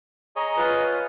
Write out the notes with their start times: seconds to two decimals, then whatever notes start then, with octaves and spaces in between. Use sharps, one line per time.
0.36 G#4 C#5 D#5 A#5
0.56 F4 B4